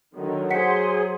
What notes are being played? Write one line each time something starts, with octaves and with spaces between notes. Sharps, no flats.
D3 D#3 F#3
G#4 C5 F#5 C6 B6 C#7